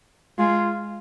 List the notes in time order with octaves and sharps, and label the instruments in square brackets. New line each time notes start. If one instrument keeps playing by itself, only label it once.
[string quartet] G#3 [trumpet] F4